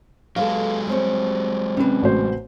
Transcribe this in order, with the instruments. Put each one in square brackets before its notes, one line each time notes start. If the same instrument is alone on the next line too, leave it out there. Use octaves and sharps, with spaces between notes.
[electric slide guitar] F#3 G#3 [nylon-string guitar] A4 B4 F5
[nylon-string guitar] G3 C4 C#5
[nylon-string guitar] C3 B4 [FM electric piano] C4 C#4
[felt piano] A1 F#4 C5